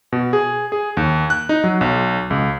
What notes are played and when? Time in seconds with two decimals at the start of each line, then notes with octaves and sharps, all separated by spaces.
0.12 B2
0.33 G#4
0.72 G#4
0.97 D#2
1.30 F#6
1.49 D#4
1.64 F#3
1.81 B1
2.30 C#2